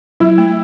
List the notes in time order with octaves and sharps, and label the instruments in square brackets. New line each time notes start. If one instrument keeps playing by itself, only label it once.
[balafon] F#3 [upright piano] E4
[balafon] A3